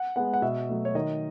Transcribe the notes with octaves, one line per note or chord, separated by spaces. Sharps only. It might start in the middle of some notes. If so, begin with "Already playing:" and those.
Already playing: F#5
G#3 B3 F#5
F#5
B2 E5
F#3 A3
C#5
D#3 D#5